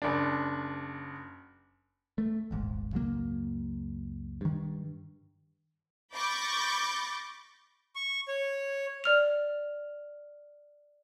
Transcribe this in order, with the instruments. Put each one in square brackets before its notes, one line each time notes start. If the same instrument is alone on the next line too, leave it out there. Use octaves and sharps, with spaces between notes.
[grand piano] F#1 D4
[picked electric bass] A3
D#1 G#1 G#2
C#2 F#2 F#3 A#3
G2 D#3
[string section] B5 C#6 D6 G6 A6 A#6
[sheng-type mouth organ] C#6
C#5
[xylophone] D5 F6 F7